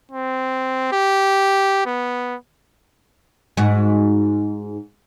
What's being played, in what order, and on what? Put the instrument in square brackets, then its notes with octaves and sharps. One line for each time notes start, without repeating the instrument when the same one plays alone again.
[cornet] C4
G4
B3
[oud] G#2 F#4